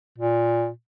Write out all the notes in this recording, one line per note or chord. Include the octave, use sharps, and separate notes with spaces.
A#2